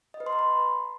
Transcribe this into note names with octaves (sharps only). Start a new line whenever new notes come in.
D#5
B4
C6
A#5
B5